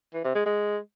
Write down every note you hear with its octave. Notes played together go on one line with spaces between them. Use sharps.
E3
C3
G#3
G#3